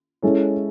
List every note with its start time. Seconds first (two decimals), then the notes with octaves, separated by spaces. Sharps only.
0.22 G#3 C#4 E4 A4 C#5